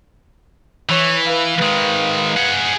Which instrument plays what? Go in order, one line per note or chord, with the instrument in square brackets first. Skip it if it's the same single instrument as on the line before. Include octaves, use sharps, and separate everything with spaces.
[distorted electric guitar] E3 [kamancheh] C#5
[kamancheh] B4 F5
[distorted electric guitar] D#3 G#3
G#4 F#5